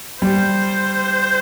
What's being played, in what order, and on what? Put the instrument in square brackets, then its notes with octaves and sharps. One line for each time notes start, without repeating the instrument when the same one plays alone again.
[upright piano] G3 [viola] C5